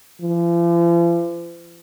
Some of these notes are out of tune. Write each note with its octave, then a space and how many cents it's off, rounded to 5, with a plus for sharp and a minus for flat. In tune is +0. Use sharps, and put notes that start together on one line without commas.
F3 -45